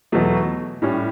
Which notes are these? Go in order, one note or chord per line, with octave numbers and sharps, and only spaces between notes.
E2 B2 F#3 A3
A2 G3 C#4